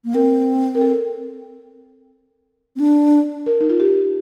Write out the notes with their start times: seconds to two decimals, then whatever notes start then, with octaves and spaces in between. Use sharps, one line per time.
0.05 A#3
0.14 C4 A#4
0.75 A#4
0.81 A4
2.76 C4
2.80 D4
3.46 A#4
3.61 D#4
3.70 F4
3.80 G4